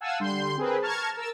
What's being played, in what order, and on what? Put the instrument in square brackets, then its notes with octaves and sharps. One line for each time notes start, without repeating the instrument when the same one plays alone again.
[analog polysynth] F5 F#5 G#5 A5 E6
D3 G3 C6 G6
C4 G#4 A#4 B4
A5 A#5 C#6 F6 G#6
A#4 E6 A6